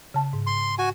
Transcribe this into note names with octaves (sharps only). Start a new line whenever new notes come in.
C#3 A5
G#2
C6
F#4 G#5